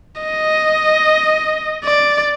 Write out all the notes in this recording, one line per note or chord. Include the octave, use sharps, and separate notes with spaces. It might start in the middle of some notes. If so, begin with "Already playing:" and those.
D#5
D5